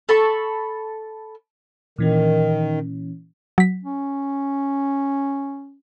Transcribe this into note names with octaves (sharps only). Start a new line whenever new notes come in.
A4 B5 C#6
A#2 D#3 E3 C#4
F#3 B6
C#4